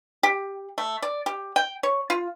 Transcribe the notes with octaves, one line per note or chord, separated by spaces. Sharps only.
G4
A3
D5
G4
G5
C#5
F4